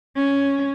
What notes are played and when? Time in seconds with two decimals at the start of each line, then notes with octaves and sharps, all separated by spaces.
0.16 C#4